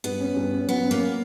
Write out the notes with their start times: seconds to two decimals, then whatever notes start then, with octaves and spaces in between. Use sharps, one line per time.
0.04 G2 B3
0.20 C#4
0.36 G2
0.53 C#4
0.69 F#3 B3
0.85 C#4
0.91 A#3